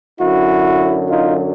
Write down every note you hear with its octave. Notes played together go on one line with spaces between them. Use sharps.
F#2 D3 F#3 E4 F#4
D#4 F4